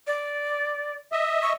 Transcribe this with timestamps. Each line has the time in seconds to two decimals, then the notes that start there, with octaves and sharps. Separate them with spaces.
0.07 D5
1.12 D#5 E5
1.42 C#6